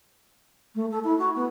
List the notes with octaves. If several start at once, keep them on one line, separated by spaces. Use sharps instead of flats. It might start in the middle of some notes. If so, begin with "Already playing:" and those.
A3
A4
E4
F#4
B3